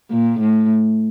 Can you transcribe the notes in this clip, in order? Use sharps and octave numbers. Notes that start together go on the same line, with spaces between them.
A#2
A2